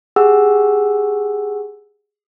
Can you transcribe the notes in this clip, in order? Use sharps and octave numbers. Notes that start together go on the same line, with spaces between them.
G4 G#4 F#5 E6